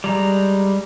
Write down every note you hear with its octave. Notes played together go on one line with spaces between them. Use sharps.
G3 G#3 A#5